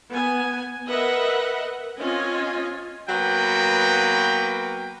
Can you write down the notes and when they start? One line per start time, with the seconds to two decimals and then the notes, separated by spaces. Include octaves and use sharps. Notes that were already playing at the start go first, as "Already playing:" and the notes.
0.11 B3 G#5
0.88 A#4 B4 D#5 E5 F#5
2.00 C4 C#4 F4 D#5 G#5
3.09 F#3 A#3 B3 F#4 B4 G5